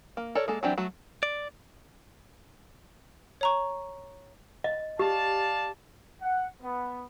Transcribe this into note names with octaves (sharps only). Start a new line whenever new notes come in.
A#3
A4 A#4 C#5 D5
G#3 A#3 A4
E3 F#3 C4 D4 G4
F#3 A3 F#4
D5
C#5 A#5 C#6
D#5
G4 D5 F5 A5
F#5
B3